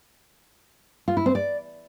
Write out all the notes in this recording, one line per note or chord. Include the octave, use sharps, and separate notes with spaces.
F4
E4
C4
D5